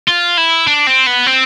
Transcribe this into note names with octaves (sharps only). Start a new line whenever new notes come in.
F4
E4
D4
C4
B3
C4